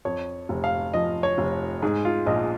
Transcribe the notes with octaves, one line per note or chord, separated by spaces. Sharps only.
F2 C#5
F1
F5
F3 D#5
C#5
F1
G#2 G#4
F4
A#1 D#5